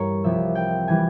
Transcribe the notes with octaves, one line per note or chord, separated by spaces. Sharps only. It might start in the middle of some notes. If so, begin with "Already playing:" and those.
Already playing: G2 E3 G3 A#4 C#5
C2 C3 F3 E5
G5
E3 G3 G#5